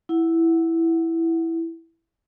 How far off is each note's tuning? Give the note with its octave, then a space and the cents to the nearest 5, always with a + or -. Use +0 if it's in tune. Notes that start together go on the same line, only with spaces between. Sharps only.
E4 +0 F#5 +0